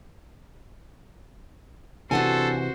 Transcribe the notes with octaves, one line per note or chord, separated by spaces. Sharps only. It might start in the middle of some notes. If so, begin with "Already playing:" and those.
C3 E3 D4 F#4 A4 C5 F#5 G#5